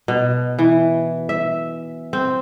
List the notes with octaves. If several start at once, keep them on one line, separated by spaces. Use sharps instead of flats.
B2
E3
E5
C4